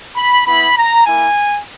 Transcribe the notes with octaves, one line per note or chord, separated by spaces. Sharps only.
B5
B3 E4 B5
A#5
A#3 E4 G#5